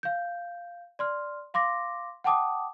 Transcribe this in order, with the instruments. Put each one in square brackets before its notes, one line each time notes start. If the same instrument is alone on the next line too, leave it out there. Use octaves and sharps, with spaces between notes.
[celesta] F5 G6
D5 C6 F6
F5 C6 D6 A#6
F#5 G5 A5 D6 D#6